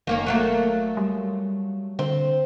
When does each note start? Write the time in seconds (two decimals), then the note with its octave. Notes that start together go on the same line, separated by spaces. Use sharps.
0.07 F#1 D#3 A#3 C#4
0.26 F#3 A3 A#3
0.97 G3
1.99 D3 C4